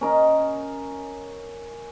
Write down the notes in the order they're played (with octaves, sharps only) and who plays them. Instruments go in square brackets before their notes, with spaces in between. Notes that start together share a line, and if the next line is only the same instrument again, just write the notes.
[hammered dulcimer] C#4 A#4 D#5